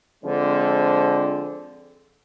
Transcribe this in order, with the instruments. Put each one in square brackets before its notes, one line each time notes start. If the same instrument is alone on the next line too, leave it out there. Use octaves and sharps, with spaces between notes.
[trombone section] D3 F3 G#3 C4